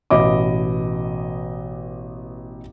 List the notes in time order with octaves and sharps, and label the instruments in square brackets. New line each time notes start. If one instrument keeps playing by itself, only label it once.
[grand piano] A1 B2 D#5 B5 D6